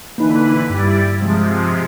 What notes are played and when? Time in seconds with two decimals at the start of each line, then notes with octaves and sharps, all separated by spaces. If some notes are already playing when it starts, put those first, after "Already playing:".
0.18 D3 E3 A#3 D#4 B4
0.70 G2 G3 E4 D5
1.19 C3 F3 G#3